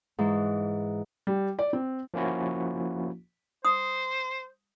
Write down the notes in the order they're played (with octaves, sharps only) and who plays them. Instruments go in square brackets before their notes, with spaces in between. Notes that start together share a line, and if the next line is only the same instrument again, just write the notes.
[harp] G#2 E3
[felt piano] G3
D5
C4
[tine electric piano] F3 A#3 C#4 E4 F#4
[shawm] C5 [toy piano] D#6